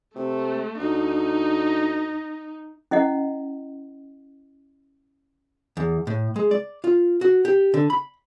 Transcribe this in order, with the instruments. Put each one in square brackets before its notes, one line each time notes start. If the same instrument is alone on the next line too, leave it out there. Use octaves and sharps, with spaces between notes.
[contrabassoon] C3 [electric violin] A3
[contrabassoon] D2 [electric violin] D#4
[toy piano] C#4 E4 D#5 F#5
[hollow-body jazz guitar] E2
A2
G#3
D5
F4
F#4
G4
D3
B5